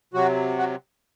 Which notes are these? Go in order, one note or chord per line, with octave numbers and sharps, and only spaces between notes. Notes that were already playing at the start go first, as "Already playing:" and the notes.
C3 F#3 F#4
F#4